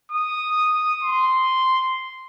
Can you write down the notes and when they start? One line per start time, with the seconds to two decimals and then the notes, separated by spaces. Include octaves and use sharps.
0.12 D#6
1.04 C6